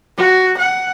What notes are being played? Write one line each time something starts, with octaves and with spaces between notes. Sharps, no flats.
F#4
F#5